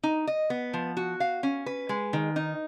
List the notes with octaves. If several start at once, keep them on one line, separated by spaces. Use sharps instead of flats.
D#4
D#5
B3
F3
F#4
F5
C#4
B4
G#3
D#3
D#4